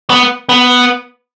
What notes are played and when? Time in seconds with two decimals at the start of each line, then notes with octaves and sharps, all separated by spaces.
0.10 B3
0.49 B3